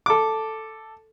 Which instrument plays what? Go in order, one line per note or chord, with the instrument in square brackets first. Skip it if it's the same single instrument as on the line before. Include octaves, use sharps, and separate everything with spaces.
[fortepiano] A4 D6